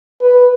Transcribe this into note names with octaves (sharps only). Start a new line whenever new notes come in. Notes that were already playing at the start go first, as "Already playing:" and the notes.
B4